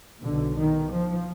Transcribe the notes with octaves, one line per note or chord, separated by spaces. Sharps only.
B1 B2 D3
D#3
F3